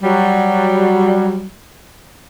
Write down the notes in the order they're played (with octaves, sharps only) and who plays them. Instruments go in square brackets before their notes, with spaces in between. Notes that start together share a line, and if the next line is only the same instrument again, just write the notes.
[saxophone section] F#3 G3